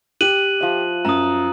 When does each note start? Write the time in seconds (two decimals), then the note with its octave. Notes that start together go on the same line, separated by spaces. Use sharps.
0.21 G4 F#6 D#7 F#7
0.61 F3 E5
1.05 F#2 A#5 D#6